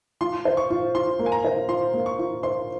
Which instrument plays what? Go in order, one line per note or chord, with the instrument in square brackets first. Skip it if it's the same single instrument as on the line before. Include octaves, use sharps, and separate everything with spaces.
[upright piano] F4 [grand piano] C6
[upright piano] C5
[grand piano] C#6
[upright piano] F4
[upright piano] F4 [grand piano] C6
[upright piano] A#3
[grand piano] G#5
A#5
[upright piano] C5
[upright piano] F4 [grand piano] C6
[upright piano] A#3
[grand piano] C#6
[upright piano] F4
[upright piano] C5 [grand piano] C6